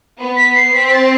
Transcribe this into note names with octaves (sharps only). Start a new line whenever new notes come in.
B3
B6
C7
C4 B6
B6
A6